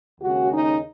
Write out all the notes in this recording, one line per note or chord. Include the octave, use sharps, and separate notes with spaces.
D#2 C#3 G#3 C#4 F#4
D#4